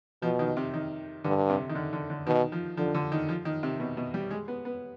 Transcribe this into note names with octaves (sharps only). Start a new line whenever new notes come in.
B2 F3
D#3
C3
D#3
G2 D3
C3
D#3
D3
D3
D3
B2 D#3
F3
D3 F3
D3
D#3
F3
D#3
C3
B2
B2
G3
G#3
B3
B3